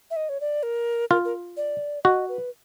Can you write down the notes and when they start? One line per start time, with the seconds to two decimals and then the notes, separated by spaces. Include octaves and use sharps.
0.11 E5
0.16 D#5
0.29 C#5
0.41 D5
0.63 A#4
1.11 F4 A#4
1.25 A#4
1.57 D5
2.04 F#4 D#5
2.29 B4